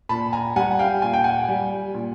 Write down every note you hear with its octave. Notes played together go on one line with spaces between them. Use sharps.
A#2 A5 B5
G#5 A#5
G3 F#5 G#5
F5 G5
A#2 G#5
G5
F#5 G#5
G3
A#2